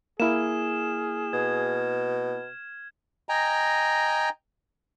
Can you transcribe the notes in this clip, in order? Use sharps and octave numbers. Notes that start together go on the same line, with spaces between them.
A#3 E4 G#4 F6 E7
B2 G#6
D#5 G5 G#5 A#5